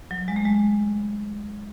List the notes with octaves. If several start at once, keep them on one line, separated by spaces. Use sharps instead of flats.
F#3
G#3
A3
G#3